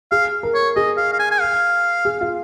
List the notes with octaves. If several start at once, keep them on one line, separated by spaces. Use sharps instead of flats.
G#4 F5
A#4
C#5
G#4 D#5
F5
F5
G#5
G#5
F5
G#4
F4